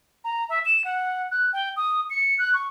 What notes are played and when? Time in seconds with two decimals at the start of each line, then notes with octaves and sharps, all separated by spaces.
0.24 A#5
0.49 E5
0.65 E7
0.84 F#5
1.31 F#6
1.53 G5
1.76 D#6
2.10 C#7
2.39 F#6
2.54 C#6